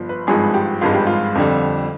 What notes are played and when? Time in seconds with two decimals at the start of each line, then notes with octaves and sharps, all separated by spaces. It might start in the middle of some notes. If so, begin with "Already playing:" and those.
Already playing: G1 F3
0.09 B4
0.27 G#1 G2 F3 G#3 G#4
0.54 G4
0.81 G#1 G2 F3 G#3 F4
0.94 G4
1.07 F4
1.35 F2 D3 G3